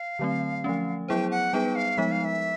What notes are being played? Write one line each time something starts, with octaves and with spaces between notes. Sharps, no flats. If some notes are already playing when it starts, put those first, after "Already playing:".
Already playing: F5
D3 F#3 A3 C4
F3 A3 C#4
F#3 B3 E4 G#4 C5 G5
F#5
G3 B3 D#4 G#4 B4 G5
F5
F3 G#3 B3 D#4 E5
F5
E5